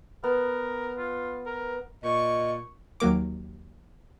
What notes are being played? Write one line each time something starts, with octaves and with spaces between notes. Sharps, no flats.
B3 A#4
F4
A#4
A#2 D#5 C#6
D#2 F#3 A#3 D6